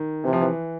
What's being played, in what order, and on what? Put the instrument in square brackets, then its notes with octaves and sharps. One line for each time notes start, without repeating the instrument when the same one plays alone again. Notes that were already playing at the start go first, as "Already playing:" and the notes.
Already playing: [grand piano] D#3
[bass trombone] C3 [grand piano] E3
[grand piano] F3
E3